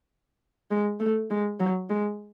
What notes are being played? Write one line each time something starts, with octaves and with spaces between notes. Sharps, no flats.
G#3
A3
G#3
F#3
G#3